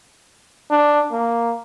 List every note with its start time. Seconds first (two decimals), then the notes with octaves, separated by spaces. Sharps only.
0.70 D4
1.12 A#3